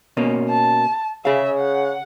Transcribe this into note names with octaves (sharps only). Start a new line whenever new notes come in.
B2 A#3 C#4
A5
C#3 G#4 E5 F5
F#5